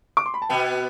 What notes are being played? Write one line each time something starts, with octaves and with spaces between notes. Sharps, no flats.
D6
C6
B5
A5
B2 B3 G5